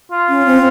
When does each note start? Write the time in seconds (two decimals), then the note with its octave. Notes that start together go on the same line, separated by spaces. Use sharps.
0.12 F4
0.29 C#4
0.46 C4